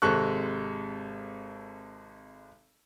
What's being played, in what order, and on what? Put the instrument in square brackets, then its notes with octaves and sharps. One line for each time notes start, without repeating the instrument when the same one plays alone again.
[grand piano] G#1 C3 G#3 A4 C#6 F#6